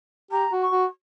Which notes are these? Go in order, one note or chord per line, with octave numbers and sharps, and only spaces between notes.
G4 A#5
F#4
C#6
F#4